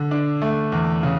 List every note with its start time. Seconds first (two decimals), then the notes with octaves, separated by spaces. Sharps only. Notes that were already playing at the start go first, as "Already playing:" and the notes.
Already playing: D3
0.11 D4
0.42 A3
0.72 E2
1.03 C#3